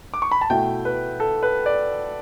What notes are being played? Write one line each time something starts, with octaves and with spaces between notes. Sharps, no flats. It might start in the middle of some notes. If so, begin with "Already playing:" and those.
D6
C#6
B5
A5
B2 A3 E4 G5
B4
A4
B4
D5